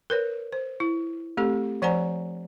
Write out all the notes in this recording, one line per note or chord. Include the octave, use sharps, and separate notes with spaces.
A#4 B4 C#5
C5
E4
A3 C4 G4 A4
F3 C5 D5 F#5 G#5 A#5